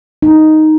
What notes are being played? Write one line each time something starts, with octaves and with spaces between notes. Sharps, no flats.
D#4